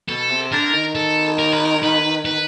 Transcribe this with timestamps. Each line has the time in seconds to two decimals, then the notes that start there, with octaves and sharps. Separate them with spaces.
0.09 B2 A4
0.30 C3
0.52 D3 A#4
0.73 D#3
0.95 A4
1.39 A#4
1.53 B4
1.65 A#4
1.83 B4
2.25 B4